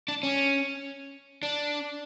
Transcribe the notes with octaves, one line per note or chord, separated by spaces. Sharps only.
D4
C#4
D4